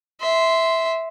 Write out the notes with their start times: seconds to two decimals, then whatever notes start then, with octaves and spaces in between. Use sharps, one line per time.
0.21 E5 C6